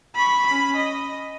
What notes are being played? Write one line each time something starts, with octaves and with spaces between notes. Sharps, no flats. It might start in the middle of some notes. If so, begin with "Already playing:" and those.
B5 C#6
C#4 B5
D#5